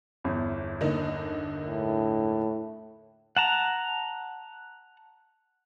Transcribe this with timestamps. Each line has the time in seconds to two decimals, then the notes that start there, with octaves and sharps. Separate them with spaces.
0.24 G1 E2
0.81 D3 A#3 D#4
1.68 A2
3.37 F#5 A5 A#5